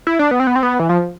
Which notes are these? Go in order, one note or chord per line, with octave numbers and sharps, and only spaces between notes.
E4
D4
B3
C4
B3
C4
B3
E3
F3